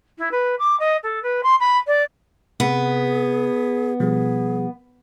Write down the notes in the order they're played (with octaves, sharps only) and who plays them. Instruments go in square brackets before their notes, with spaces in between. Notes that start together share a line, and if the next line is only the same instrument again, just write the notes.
[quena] E4
B4
D6
D#5
A4
B4
C6
B5
D5
[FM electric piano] C3 [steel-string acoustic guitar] B3 [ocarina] G#4
[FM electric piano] B2 F3 G3 [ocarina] G#4